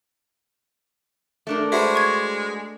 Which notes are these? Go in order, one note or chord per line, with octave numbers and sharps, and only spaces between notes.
A3 D4 A#4
G#3 F#4 B4 C5 E5
C#6 G#6